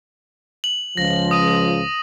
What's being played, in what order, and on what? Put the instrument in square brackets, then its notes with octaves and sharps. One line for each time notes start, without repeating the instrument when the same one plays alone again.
[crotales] F#7
[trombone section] C#2 F3 [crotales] A#6
[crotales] D#6 D#7